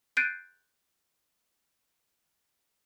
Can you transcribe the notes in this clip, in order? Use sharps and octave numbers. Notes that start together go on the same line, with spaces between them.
F#6 G6 A6 C7 D7 D#7